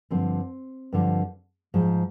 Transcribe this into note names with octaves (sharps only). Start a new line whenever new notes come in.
G2 D3 F3 C4
G2 D3 F3
G#2 F3